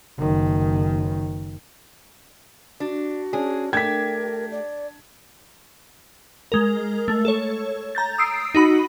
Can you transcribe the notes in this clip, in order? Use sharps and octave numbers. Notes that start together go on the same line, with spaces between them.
F#1 D#3
D4 F#4
C#4 D4 G#4
A3 D4 G4 A#4 G#6 B6
D5
G#3 A#4
A3
A4 C#5
A#5 G6 A6
D#6 E6 C7 D7
D#4 F#4 B5